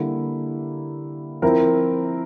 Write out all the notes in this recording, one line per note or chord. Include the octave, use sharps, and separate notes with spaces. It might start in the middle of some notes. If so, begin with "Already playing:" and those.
Already playing: D3 G3 A#3 E4
F3 C4 E4 A#4